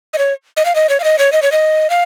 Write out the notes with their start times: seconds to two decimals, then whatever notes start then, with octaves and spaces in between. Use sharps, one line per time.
0.13 D#5
0.18 C#5
0.57 D#5
0.65 F5
0.75 D#5
0.89 C#5
1.00 F5
1.04 D#5
1.18 C#5
1.32 D#5
1.42 C#5
1.52 D#5
1.90 F5